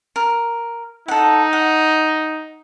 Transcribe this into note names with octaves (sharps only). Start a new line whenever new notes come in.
A#4
D#4 A4 F#5
F#5